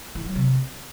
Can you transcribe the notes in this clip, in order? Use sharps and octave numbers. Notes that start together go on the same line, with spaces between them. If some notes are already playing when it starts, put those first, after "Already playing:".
E3
F#3
C3